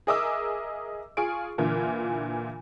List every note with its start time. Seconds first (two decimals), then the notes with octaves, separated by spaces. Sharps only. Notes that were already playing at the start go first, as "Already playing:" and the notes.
0.07 G#4 A#4 D#5 E5 D6 E6
1.17 F4 G#4 G#5 C#6 D7
1.58 A#2 D3 E3 F4